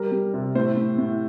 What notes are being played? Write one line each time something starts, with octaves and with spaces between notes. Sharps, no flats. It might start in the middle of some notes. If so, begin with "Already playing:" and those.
Already playing: G3 A#4
G3
C3
A2 C5
A2
A2